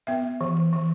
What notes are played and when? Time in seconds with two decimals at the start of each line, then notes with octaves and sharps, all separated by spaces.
0.07 B3 E5
0.41 E3
0.73 E3